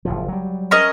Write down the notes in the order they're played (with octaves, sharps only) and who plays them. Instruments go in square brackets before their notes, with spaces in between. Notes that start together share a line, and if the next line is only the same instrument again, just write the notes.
[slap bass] F#1 A2 F3
F#3 G3
[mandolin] C#4 A#4 D#5